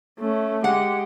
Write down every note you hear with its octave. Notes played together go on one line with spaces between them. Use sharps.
A3 C#4
G#3 G4 F#5